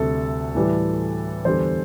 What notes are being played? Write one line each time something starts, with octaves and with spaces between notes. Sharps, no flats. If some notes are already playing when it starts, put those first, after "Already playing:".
Already playing: D2 C3 G3 A4
A2 E3 G3
E2 D3 G3 C5